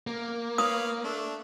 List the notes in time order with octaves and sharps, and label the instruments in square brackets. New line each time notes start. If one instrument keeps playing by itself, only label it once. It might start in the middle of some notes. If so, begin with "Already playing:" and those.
[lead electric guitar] A#3
[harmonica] B4 C#5 F5 [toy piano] D#6
[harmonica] A3 D4